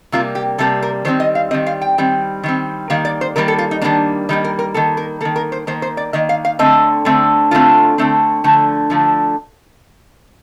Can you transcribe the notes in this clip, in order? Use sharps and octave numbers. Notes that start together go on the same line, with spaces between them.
C3 G3 A#3 F4
G4
C3 G3 A#3 A4
A#4
D#3 G3 C4 C5
D#5
F5
D#3 G3 C4 D#5
F5
G5
D#3 G3 C4
D#3 G3 C4
D#3 G3 A#3 F5
D5
C5
D#3 G3 A#3 A#4
A4
F4
D#4
D#3 G3 A#3 D4
D#3 G3 A#3 D#4
A#4
A#4
D#3 A#3 A4
A#4
D#3 A#3 A4
A#4
C5
D#3 A#3 C5
C5
D5
D#3 A#3 D#5
F5
F5
D3 A3 C4 D#5
D3 A3 C4
D3 A3 C4 F4
D3 A3 C4
D3 F3 A3
D3 F3 A3